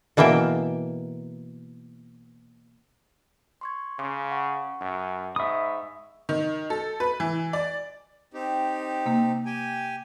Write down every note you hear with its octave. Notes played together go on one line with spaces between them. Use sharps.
B2 E3 A#3 E5 G5
C6 C#6 G#6
C#3 C6 D6
F#5 C#6
F#2
G#2 E5 B5 C#6 D#6
D#3
A4
B4
E3
D5
C4 D#4 G4
C3 A#3
G4 G5 G#5